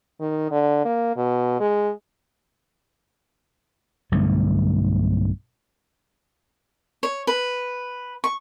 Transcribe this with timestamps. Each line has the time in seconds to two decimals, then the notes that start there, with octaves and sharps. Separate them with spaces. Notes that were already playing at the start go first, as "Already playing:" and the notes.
0.20 D#3
0.51 D3
0.85 A#3
1.17 B2
1.60 G#3
4.12 B1 G2 D3 A3
7.03 C#5
7.27 B4
8.24 C#6